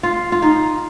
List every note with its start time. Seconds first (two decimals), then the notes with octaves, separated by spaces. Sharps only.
0.03 F4
0.32 F4
0.42 D#4